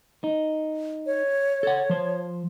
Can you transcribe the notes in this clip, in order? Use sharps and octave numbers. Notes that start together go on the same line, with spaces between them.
D#4
C#5
A4 F#5
F3 C5